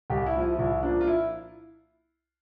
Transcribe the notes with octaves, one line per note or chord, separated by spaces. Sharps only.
C2 G4
E4
A#2 F3
E4
F4
C2 E4
A#2 F3 A#3 D4
F4
E4